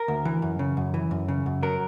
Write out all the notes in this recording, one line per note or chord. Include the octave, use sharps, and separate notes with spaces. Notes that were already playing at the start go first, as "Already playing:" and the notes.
Already playing: A#4
D2
E3
F#2
C#3
F#2
E3
F#2
C#3
F#2
F#3 A#4